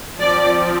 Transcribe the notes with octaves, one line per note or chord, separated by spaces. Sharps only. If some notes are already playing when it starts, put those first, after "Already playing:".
F3 C4 D5